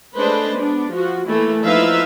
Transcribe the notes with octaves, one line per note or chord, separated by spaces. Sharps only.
G#3 A3 D4 B4 C5
B3 D4
F3 F#4
E3 A3 A#3 E4
F3 D#4 E4 B4 E5 F5